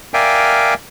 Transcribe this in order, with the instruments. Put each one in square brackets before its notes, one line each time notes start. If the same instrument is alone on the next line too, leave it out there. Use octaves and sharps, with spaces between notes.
[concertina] A#4 D5 E5 F5 G5 G#5